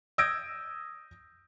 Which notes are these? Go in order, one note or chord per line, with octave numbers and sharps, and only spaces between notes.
D#6 E6 G6 G#6 A#6 D7